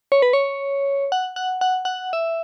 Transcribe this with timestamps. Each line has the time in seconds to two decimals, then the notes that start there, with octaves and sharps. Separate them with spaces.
0.12 C#5
0.22 B4
0.33 C#5
1.12 F#5
1.36 F#5
1.61 F#5
1.85 F#5
2.13 E5